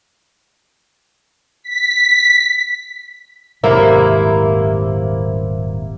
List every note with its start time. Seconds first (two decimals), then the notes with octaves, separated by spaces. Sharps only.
1.63 B6
3.64 D#1 G#2 C3 F#3 A#3 E4 A#4